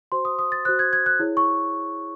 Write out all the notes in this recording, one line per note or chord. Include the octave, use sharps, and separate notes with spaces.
F#4 C5 C6
D#6
D#6
A6
F#4 C5 F#6
G#6
G#6
F#6
E4 G#4 C#5
C#6